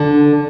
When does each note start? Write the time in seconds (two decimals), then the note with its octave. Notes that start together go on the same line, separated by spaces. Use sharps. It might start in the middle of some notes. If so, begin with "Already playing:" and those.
Already playing: D3